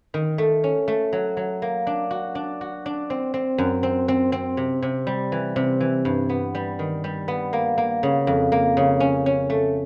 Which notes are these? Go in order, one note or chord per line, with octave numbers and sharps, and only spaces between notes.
D#3
A3
C#4
A3
F#3
F#3
A#3
D4
F#4
D4
F#4
D4
C4
C4
F#2
C4
C4
C4
C3
C3
G3
E3
C3
E3
G2
B3
G3
D#3
G3
B3
A#3
A#3
C#3
F2
A#3
C#3
C#4
C#4
A3